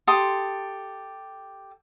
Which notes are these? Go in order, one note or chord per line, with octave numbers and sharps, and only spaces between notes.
G4 A4 C6 D#6